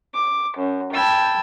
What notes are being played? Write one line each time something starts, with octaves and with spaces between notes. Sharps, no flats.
D6
F#2
G5 A5 B5 E6 G#6